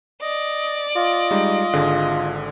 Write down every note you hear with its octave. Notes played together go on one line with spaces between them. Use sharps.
D5 D#5
F4 D#5
G3 G#3 D#4
G#1 D3 G#4